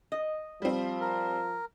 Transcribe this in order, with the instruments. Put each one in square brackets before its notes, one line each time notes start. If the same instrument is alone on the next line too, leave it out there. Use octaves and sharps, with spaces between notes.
[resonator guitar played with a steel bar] D#5
[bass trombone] F3 [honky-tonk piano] G3 C4
[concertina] A#4